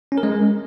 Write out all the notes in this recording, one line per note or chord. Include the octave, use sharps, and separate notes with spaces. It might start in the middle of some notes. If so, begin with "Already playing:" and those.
C#4
A#4
G#3